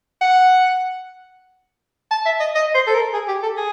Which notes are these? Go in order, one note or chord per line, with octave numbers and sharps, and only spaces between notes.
F#5
A5
E5
D#5
D#5
C5
A4
A#4
G#4
G4
A4
G#4